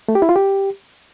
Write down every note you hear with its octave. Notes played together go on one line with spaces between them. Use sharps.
A3
G4
E4
F4
G4